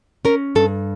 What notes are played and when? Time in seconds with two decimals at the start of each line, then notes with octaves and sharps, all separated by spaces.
0.25 C#4 A#4
0.55 G2 A4